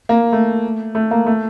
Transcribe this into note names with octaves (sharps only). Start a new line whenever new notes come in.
A#3
A3
A3
A#3
A3